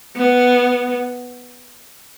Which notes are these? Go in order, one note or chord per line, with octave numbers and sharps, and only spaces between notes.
B3